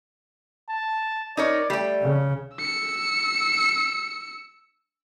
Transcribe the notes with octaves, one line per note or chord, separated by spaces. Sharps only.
A5
D#4 A#4 C#5 D5
G3 A3 G5
C#3
E6 C#7